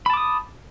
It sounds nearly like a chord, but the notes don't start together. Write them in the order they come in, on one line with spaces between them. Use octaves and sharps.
B5 A5 D6 D#6